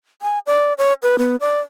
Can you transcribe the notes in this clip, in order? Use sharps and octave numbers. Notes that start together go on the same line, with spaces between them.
G#5
D5
C#5
B4
B3
D5